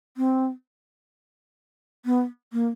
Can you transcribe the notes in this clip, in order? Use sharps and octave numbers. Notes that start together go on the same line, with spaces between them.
C4
B3
A#3